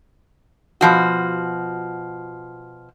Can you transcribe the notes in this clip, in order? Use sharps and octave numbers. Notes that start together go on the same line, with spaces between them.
B2 F3 F#4